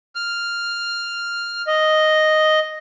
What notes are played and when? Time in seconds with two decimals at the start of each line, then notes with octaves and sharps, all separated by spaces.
0.15 F6
1.67 D#5